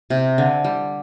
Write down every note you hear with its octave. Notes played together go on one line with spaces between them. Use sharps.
C3
D3
G3